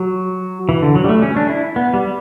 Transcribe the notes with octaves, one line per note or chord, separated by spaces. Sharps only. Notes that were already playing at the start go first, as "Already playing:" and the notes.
Already playing: F#3
E3
D3
F#3
G3
A3
C#4
D4
E4
B3
G3